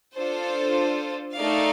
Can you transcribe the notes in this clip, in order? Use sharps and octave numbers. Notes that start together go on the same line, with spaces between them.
D4 F4 A4 C5
A3 D#4 A#4 D5 F5